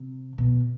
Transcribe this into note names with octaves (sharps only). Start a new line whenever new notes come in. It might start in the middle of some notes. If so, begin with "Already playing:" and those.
Already playing: C3
B2